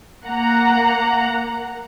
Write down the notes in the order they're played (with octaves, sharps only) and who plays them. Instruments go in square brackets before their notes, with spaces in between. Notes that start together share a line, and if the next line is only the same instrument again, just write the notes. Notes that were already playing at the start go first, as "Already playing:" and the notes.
[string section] A#3 F#5 A#5